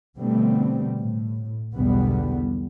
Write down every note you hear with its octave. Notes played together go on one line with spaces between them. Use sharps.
B2 D3 G3 A3 B3 C4
A2
B1 E2 D3 G3 B3